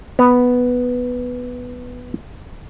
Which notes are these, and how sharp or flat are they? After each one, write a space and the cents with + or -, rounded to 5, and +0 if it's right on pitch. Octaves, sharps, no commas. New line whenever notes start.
B3 +0 A#5 +0